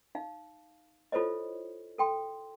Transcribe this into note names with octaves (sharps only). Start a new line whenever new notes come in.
D#4 F5
E4 F4 A4 C5 C#5 D#5
A4 G5 C6